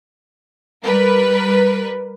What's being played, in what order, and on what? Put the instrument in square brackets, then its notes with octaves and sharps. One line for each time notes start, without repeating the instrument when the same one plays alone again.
[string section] G3 A#4 B4